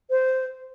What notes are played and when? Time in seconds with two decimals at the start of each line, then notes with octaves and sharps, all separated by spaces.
0.11 C5